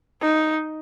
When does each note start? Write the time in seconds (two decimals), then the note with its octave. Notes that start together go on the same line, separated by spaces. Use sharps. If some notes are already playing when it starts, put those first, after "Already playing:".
0.21 D#4